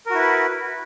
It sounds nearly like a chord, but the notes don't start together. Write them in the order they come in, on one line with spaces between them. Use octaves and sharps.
A#4 F#4 E4 B4